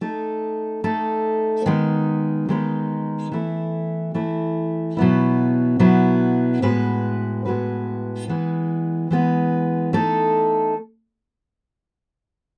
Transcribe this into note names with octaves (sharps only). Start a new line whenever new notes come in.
A3 D#4 A4
A3 D#4 A4
D#3 G#3 B3 D#4
D#3 G#3 B3 D#4
E3 A3 E4
E3 A3 E4
B2 F#3 B3 E4
B2 F#3 B3 E4
A2 G#3 B3 F#4 B4
A2 G#3 B3 F#4 B4
E3 G#3 B3
E3 G#3 B3
A3 D#4 A4